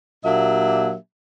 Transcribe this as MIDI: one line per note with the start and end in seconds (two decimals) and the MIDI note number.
0.24 0.94 46
0.24 0.94 54
0.24 0.94 58
0.24 0.94 62
0.24 0.94 67
0.24 0.94 76